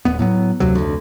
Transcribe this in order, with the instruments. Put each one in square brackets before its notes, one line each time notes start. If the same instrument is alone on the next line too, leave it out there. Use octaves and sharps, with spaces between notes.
[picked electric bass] D#1 B3
A2 F#3 B3
F1 D2 C3 F#3
F1 D2